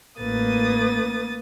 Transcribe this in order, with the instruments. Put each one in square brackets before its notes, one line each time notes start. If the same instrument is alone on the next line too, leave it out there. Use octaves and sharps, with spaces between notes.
[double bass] A1 [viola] A#3 [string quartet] B4 D#6 A6